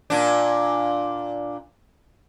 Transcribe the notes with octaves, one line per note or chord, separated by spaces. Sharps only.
A#2 D4